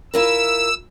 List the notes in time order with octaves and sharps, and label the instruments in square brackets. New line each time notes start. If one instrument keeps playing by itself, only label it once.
[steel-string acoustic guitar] E4 F4 A#4 [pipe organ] E6